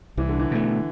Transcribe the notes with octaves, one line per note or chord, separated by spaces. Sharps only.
C2 E3
D3
E3
B2 A3